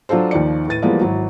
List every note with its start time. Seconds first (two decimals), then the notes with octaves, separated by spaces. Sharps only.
0.09 F#3 D4 F4 A4 C5
0.31 D#2 D#3 F3 D5 C#7
0.68 A2 B4 A6 D#7
0.82 E3 F3 G3 G#3 A#3 B3
1.01 G#1 E3 F#3